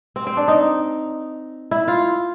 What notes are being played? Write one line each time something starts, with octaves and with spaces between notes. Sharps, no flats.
C4
C4
D4
D#4
E4
F4